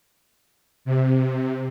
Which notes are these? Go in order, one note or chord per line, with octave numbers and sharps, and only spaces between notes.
C3